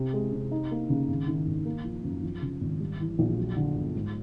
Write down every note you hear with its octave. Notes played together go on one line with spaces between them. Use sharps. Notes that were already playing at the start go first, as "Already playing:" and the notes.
Already playing: C3
G#3
C3
D#4
A#3
C#3
G#1
D#3
G#1
A#3
F3
F#2
F3
C#3
G#1
G3
E3
A#1
F#3
D3
G1
G#2